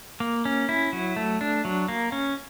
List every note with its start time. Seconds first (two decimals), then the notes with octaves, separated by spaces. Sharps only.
0.20 A#3
0.45 C#4
0.69 E4
0.93 F#3
1.16 A3
1.41 D4
1.65 F#3
1.88 A#3
2.12 C#4